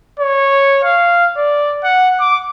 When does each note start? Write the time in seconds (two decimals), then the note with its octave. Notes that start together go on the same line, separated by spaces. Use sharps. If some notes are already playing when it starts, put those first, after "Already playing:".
0.20 C#5
0.84 F5
1.37 D5
1.84 F#5
2.20 D6